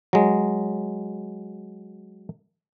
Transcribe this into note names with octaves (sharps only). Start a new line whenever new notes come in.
F#3 G#3